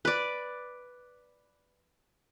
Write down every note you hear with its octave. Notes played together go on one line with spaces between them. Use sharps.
B4 D5